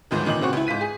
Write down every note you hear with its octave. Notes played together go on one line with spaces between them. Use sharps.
G1 D2 G#2 D#3 F3
G1 A#2 D#3 D#4 F#7
A#2 C#3 C4 F#4 C#6
C#2 E4
G#2 F4 B6 D#7
G#4